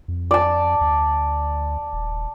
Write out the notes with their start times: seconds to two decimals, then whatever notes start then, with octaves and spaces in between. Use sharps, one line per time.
0.08 F2
0.31 D5 A5
0.81 D2
1.93 D#1